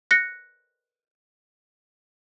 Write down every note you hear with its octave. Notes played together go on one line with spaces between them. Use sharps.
F#6 A#6 C#7